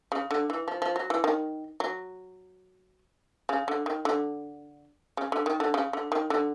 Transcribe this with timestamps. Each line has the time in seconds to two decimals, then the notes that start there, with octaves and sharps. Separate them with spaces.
0.12 C#3
0.31 D3
0.50 E3
0.68 F3
0.82 F3
0.96 F#3
1.10 E3
1.24 D#3
1.80 F#3
3.49 C#3
3.68 D3
3.86 D#3
4.05 D3
5.17 C#3
5.32 D3
5.46 D#3
5.60 D3
5.74 C#3
5.93 D3
6.12 D#3
6.30 D3